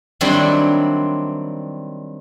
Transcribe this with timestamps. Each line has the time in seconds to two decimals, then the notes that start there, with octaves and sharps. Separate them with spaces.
0.21 D#3 F#3 G3 C4 D4 E4